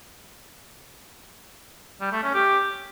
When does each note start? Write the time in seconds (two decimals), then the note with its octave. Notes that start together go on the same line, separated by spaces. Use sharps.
2.01 G3
2.12 A3
2.23 C#4
2.34 G4